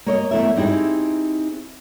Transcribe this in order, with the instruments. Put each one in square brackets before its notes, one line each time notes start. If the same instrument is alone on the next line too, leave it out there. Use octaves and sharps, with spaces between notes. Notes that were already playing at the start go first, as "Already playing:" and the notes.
[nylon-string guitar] A#3 C#5 D#5
E2 A3 E4 A#4 E5
C4 D#4 E4 G4 G#4